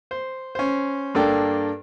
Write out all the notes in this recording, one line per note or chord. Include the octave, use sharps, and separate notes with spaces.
C5
C#4 C5
G2 A#3 A4 D5 G5